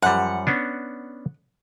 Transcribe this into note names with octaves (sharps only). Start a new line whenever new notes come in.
F#2 F3 G3 F#5
B3 C#4 D4